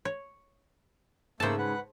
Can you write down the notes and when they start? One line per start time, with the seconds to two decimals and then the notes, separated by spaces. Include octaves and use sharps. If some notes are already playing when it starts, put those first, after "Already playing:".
0.05 C#5
1.40 G#2 C#3 A3 A#3 C5 A5 E6
1.58 B4 F#5